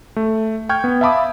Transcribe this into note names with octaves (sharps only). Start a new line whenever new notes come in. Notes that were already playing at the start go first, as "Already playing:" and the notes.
A3
G5 C#6 F6 G6 G#6
B3
E5 F5 A5 B5 D6 D#6